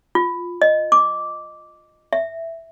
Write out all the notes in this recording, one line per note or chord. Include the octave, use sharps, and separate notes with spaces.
F4
D#5
D6
E5